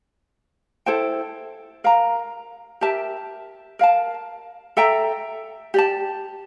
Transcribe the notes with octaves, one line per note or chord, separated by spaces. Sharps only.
E4 A4 C5 G5
A#4 F5 A#5
G4 A#4 E5 A5
A#4 F5 A5
A4 E5 G5 A#5
G4 D5 A5